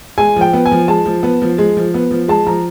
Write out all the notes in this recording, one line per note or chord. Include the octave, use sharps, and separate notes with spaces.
G#3 G#5
F3 G5
B3
G#5
F3
G#3 A5
F3
B3
F3
G#3
F3
B3
F3
G#3 A5
F3 A#5